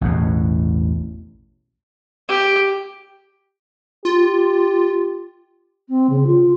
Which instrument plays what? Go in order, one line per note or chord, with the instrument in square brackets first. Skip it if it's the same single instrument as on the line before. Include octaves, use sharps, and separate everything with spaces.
[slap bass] A1 E2 B2
[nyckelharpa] G4
[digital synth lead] F4 [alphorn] G4
[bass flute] C4
C#3
F4